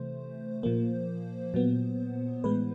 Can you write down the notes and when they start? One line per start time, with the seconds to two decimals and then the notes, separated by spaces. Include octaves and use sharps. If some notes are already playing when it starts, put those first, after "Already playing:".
Already playing: C3 E3 A3 C5
0.63 A#2 F3 A#3
1.54 A#2 F#3 B3
2.44 A2 E3 G#3 B3 B4